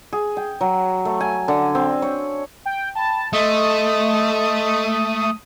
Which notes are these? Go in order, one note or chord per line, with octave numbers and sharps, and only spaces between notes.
G#4
G5
F#3
A3
G#5
D3
C4
C#5
G5
G5 A5 B5
A3 D#5 C6 D#6